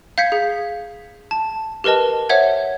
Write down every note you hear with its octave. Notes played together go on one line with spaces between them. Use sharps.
F5 G6 G#6 B6 C#7
G#4
A5
G4 A#4 B4 D#5 A5
C5 C#5 E5 F#5 G#6